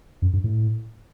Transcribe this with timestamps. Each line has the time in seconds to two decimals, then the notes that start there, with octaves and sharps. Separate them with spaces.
0.22 F#2
0.33 G2
0.44 A2